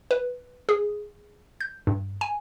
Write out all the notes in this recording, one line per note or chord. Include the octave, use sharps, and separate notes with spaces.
B4
G#4
G6
G2
G#5